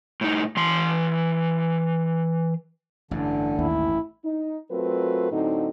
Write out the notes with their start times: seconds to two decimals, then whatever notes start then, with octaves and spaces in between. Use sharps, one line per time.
0.21 A2 D#4
0.57 E3 C6
3.11 A1 G2 D3
3.59 D#2 E4
4.25 D#4
4.71 F#3 A3 C4 F4 A#4 B4
5.31 A2 D3 F#3 C4 D#4